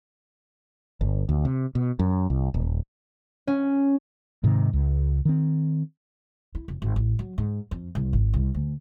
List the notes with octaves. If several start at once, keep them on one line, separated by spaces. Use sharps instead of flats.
G1
D2
C3
B2
F#2
C2
D#1
C#4
G#2 C3 D#3
C#2
D#3 C4
E4
F1
G#1
A1
F#3
G#2
F2
C2
G#1
C2
D2